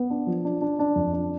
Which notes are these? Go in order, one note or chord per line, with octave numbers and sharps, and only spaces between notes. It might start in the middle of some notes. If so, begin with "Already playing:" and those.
Already playing: B3
D4
F3
D4
D4
D4
F2
D4